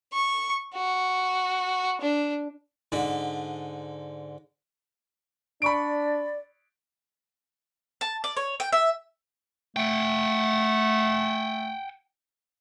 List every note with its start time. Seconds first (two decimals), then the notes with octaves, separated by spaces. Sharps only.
0.13 C#6
0.75 F#4
2.01 D4
2.92 G#2 D3
5.62 D4 D5 B5 C#6 D7
8.01 A5
8.24 D5
8.37 C#5
8.60 G5
8.72 E5
9.76 A3 F#5 G5